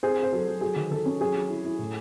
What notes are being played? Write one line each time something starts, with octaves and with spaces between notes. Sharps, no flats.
C4 G#4 C5
C4
C5
F#3 A4
F#3
F#3 G#4
D#3
D#3 A4
C#4
F#3 G#4
F#3
E4
E4
A2